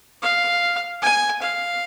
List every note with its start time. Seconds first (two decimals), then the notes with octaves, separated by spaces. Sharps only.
0.22 F5
1.02 G#5
1.42 F5